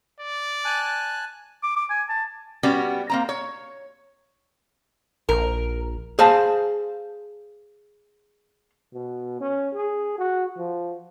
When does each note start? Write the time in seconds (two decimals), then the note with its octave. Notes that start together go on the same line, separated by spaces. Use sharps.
0.20 D5
0.65 G#5 A5 F#6
1.63 D6
1.76 D6
1.90 G#5
2.09 A5
2.63 G3 B3 C#4 F#4 G4
3.09 A#3 C4 A#5
3.29 C#5
5.29 A#1 A#4
6.19 G#4 C5 F5 A5
8.94 B2
9.41 C#4
9.74 G#4
10.18 F#4
10.57 F3